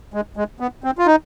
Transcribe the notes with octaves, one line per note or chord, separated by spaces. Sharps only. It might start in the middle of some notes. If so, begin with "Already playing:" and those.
G#3
G#3
B3
C4
F4
D#4